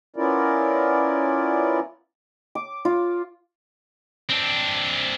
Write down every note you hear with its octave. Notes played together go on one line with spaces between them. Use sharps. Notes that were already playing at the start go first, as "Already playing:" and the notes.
B3 C#4 E4 F4 A#4 D5
D6
F4
C4 D4